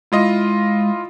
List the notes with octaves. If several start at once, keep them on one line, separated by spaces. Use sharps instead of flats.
G#3 E4 F4 D#5